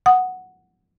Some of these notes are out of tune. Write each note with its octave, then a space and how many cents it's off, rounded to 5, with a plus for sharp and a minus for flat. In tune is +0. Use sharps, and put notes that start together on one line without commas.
F#5 +0 D#6 +0